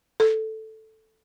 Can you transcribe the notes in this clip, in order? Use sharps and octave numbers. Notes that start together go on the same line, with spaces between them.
A4